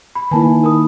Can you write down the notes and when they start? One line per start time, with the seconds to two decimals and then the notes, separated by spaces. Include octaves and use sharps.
0.15 B5
0.31 D#3 A#3 E4 B4 G#5 A5
0.64 A#4 B5 D#6